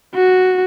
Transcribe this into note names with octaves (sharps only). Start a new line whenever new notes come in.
F#4